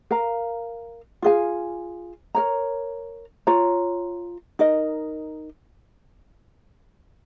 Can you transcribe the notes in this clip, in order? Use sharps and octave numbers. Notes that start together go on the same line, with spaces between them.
A#4 F5 A#5
F4 G#4 F5 G#5
A#4 C#5 A#5
F4 C#5 A#5
D#4 A#4 D#5